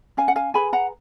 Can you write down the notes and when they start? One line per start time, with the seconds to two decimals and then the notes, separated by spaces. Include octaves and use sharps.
0.17 C#4 F5 G#5
0.28 F#5
0.36 F5 G#5
0.54 G#4 B4 G#5 B5
0.73 F#5 A#5